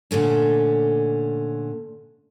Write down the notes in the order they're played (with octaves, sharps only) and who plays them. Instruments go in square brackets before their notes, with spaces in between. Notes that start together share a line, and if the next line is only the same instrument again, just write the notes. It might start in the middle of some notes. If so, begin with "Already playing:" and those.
[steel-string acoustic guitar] A#2 D3 A3 C#4